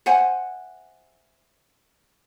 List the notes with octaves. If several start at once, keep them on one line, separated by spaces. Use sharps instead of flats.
C5 E5 F#5 G#5